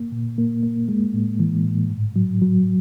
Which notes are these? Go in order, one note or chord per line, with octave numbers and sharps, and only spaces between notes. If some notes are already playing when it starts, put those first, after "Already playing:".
Already playing: A#3
A#2
A#3
A#3
G#3
A2
E3
A2
G#2
F#3
F#3